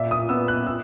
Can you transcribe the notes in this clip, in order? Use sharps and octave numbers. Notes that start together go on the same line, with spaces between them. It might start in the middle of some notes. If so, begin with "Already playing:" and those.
Already playing: A#2 E5
D#6
B3 E6
F#6
E6